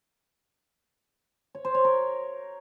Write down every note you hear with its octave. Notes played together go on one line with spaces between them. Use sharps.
C#5
C5
C#5
A#4